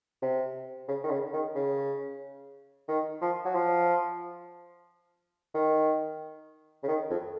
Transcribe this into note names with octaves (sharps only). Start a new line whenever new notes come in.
C3
C#3
D#3
C#3
D#3
C#3
D#3
F3
F#3
F3
D#3
C#3
D#3
F2